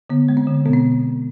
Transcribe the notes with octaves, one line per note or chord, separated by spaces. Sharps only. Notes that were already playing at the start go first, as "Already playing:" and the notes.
D3 B3
G#3
C4
D3
B2 B3
C4